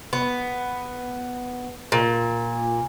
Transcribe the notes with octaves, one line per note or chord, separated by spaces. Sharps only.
B3
A#2